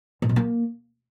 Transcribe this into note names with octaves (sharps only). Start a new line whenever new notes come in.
A#2
B2
A#3